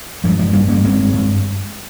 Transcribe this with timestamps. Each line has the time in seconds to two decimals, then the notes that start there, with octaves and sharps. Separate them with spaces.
0.24 G2 F3 G#3
0.39 F3 G#3
0.53 G2 G3 A#3
0.68 A#3 C#4
0.84 G2 G#3 C4
1.14 G2